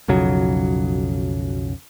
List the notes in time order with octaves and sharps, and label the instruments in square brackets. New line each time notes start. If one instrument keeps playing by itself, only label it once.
[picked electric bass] B1 F2 C#3 F#3